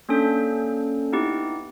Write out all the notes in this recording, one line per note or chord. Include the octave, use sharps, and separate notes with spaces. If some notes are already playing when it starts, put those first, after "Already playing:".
A#3 C#4 D4 A4
B3 D#4 E4 G4